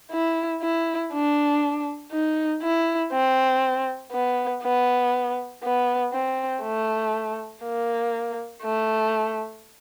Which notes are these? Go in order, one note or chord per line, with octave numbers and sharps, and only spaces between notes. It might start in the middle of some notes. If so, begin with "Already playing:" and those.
E4
E4
D4
D#4
E4
C4
B3
B3
B3
C4
A3
A#3
A3